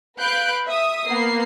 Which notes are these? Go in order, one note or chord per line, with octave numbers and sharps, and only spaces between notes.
B4 F5 B5 F#6 G6 D7
E5 D#6
A#3 B3 C7